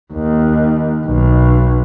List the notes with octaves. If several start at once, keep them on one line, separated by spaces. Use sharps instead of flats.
D#2
B1